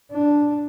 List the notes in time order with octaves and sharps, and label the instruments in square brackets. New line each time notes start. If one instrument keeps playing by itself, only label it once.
[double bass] D4